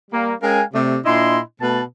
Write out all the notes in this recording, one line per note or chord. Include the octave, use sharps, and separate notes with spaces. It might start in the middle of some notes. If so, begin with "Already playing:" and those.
G3 A#3
G#3 C#4 A#4 F5 G5 G#5
C3 A3 D5
A#2 D4 E4 D#5 C6
B2 A3 B4 A5